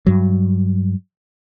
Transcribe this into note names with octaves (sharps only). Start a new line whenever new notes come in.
G2 F#3